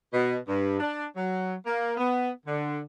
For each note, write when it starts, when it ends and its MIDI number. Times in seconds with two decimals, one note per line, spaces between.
0.12 0.35 47
0.47 0.77 43
0.79 1.04 62
1.16 1.54 54
1.65 1.93 58
1.97 2.29 59
2.46 2.80 50